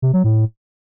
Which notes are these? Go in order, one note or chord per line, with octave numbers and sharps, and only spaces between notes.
C3
F#3
A2